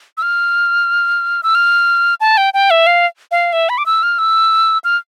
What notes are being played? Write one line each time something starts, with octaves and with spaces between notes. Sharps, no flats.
E6
F6
E6
F6
A5
G5
G5
E5
F5
F5
E5
B5
D6
E6
F6
E6
F6